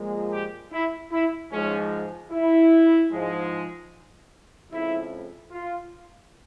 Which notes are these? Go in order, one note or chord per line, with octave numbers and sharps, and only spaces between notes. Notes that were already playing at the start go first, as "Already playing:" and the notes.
Already playing: A#2 F3 G#3
G4
E4
E4
G#2 F3 G#3 C#4
E4
G#2 F3 G#3
F2 C#3 F3 G#3 E4
F4